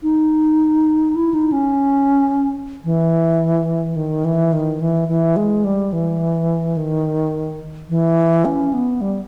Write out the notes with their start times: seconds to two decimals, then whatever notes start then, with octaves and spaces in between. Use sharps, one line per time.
0.03 D#4
1.15 E4
1.34 D#4
1.52 C#4
2.84 E3
3.96 D#3
4.25 E3
4.53 D#3
4.81 E3
5.08 E3
5.36 G#3
5.64 G3
5.93 E3
6.77 D#3
7.89 E3
8.45 C#4
8.73 B3
9.01 G3